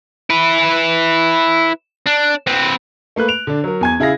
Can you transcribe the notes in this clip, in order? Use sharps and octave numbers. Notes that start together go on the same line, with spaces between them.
E4 B4
D4
C4 B4
A3 A#3 B4 F#6
D7 F7
D3 D4
F#3 A#4
E2 G#5 G#6
C#3 E4 G#4 F5 A#6